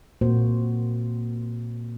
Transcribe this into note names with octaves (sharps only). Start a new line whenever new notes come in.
A#2 A#3 C4 F#4 C5